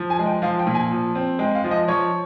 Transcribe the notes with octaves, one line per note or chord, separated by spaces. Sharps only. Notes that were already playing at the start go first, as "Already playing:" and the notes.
Already playing: F3
G#5
G#3
G5
F3 F5
G5
A#2
G#5
F3
C4
G#3 G5
F5
F3
D#5
F3 C#5